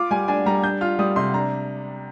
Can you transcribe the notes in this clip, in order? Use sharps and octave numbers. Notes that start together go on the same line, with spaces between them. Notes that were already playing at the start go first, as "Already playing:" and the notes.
Already playing: F4 D6
G3 G#5
D4 G#5
G3 A#5
D4 G6
F4 F6
G3 D#6
C3 C6
D4 A#5